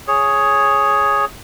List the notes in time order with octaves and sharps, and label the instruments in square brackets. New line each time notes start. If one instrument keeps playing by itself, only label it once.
[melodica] G#4 C#5